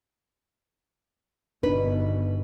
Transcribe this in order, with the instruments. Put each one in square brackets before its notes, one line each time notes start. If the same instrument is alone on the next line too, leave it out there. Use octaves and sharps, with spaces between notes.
[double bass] G1 B2 [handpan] D4 D#4 [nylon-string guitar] B4